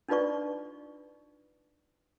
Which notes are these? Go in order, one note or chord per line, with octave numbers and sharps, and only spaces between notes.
D4 D#4 F4 B4 D5 C#6